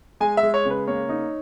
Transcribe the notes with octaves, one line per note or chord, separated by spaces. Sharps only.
G#3 G#5
E5
G#3
C#5
C#3 B4
A#3 C#5
D#4